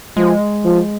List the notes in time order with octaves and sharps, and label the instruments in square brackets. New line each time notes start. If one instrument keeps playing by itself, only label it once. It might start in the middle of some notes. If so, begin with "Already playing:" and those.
[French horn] F3 [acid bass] G#3
[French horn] F3